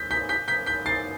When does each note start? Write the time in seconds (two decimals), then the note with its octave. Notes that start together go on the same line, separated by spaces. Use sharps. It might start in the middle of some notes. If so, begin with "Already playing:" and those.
Already playing: G6 B6
0.11 G6 B6
0.29 G6 B6
0.48 G6 B6
0.66 G6 B6
0.86 A6 C7